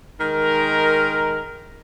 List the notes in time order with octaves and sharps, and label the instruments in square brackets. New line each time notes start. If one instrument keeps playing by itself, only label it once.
[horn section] D#3 G#3 A#4